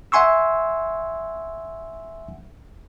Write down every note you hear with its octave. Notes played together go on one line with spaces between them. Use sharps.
E5 F#5 G#5 C6 C#6 E6